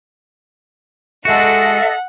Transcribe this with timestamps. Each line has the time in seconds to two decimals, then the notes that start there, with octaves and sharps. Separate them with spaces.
1.25 G#3 F#4 A4 D#5 E5 F#5